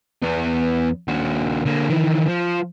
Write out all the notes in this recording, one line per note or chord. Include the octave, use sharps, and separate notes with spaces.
E2 B3
D#2 F#4
D3 A#3
D#3 E3
F3